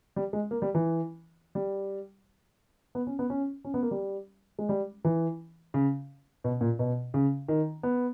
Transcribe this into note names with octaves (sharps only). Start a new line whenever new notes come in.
G3
G#3
A#3
G3
E3
G3
B3
C#4
B3
C#4
C#4
B3
A#3
G3
G#3
G3
E3
C#3
B2
A#2
B2
C#3
D#3
B3